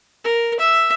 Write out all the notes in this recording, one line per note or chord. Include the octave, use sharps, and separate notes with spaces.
A#4
E5